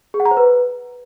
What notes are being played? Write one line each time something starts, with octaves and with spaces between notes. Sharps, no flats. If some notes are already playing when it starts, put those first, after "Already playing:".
G#4
F#5
A#5
C5
B4